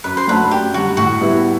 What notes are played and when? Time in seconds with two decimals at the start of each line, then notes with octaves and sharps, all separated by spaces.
0.04 F#2 B4
0.17 C5
0.27 F#3 A3 D4 F#4 B4
0.51 F#2 G4
0.74 D3 G3 F#4
0.97 A2 F#4
1.21 G3 B3 E4